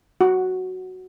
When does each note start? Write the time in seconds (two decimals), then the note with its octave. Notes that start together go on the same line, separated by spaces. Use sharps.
0.21 F#4